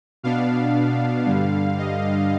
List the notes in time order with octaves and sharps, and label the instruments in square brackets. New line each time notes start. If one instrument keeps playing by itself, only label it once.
[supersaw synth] B2 B3 D4 F5
G2 D3 G3
D#5